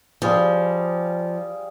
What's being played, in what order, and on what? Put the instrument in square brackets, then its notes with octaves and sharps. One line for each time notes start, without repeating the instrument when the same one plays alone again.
[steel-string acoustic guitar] F3 [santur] G3 G#4 F5